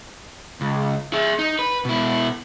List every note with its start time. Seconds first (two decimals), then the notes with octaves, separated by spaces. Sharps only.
0.61 C#2
1.13 G#4 E5
1.39 D#4
1.59 B4
1.85 B2 E4